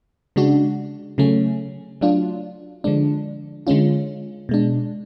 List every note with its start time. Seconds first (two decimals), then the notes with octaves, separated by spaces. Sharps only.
0.36 C#3 G#3 D4 F#4
1.18 C#3 F#3 A3 C#4
2.01 F#3 A3 D4 F4
2.84 D3 F3 G#3 D4
3.67 D3 G#3 C#4 F4
4.49 B2 G#3 D4